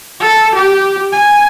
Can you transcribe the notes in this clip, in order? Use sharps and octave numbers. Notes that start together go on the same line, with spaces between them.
A4
G4
G#5